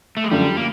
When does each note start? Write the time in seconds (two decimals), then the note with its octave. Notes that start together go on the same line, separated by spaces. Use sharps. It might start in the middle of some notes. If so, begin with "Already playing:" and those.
0.17 A3
0.24 G#3
0.31 F#2 D3 F3 G3
0.57 A#3